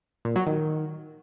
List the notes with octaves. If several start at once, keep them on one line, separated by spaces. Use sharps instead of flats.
A#2
F#3
D#3